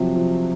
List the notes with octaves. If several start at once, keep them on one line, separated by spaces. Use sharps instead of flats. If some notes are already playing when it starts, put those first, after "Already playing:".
Already playing: C3 F3 F#3
F3